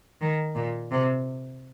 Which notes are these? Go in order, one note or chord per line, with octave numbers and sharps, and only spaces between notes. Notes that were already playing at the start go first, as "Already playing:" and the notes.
D#3
A#2
C3